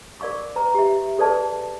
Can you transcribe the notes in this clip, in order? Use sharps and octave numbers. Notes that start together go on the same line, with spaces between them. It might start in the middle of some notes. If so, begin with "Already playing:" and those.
A#4 D5 F5 C#6 D6
B4 A#5
G4 E5
G#4 A4 B4 D5 A5